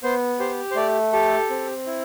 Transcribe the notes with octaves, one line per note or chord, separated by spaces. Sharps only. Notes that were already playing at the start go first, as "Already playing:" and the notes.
B3 C5
G4 C5
C5
A3 D5
G4 A4
C4
E4